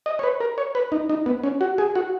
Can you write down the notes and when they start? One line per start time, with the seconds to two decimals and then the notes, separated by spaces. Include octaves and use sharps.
0.06 D#5
0.19 C#5
0.23 B4
0.40 A#4
0.58 C#5
0.75 B4
0.92 D#4
1.10 D#4
1.26 B3
1.43 C#4
1.61 F#4
1.78 G#4
1.95 F#4